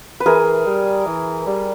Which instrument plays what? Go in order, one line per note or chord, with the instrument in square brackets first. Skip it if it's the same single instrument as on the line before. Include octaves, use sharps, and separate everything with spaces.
[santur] B4
[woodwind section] E3 [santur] G#4 A#4
[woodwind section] G3
E3
G3